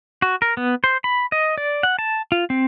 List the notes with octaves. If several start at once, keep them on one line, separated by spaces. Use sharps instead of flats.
F#4
A#4
B3
C5
B5
D#5
D5
F#5
A5
F4
C4